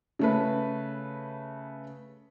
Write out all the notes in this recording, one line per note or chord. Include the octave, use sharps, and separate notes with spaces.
C#3 A3 B4